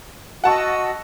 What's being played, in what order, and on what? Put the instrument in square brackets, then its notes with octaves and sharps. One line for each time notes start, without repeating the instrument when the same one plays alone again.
[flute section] F#4 D#5 E6 [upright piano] F#5 A5 C#6